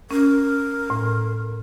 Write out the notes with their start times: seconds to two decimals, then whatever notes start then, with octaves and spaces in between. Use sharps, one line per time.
0.11 C#4 A#4
0.90 A2